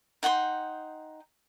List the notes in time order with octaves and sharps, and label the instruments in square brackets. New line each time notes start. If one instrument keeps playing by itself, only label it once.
[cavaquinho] D#4 F#5 G5 C6